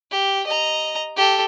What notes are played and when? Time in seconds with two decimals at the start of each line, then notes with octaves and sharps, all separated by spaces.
0.11 G4
0.46 D#5 A#5
1.17 G4 A4